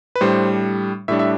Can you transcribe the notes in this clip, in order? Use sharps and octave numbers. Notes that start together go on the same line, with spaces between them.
B4
A2 G3 D4 C5
A2 G3 D4 E5
E5